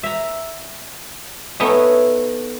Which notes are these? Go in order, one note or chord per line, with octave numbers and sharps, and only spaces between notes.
E5 A#5
A3 B3 D#4 C#5 E5 G#5